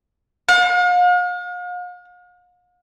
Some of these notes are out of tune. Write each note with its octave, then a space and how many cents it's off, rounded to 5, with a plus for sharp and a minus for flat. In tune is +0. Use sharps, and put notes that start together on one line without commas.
F5 +45